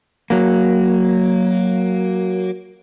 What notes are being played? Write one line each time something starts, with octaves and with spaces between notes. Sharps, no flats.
F#3 A#3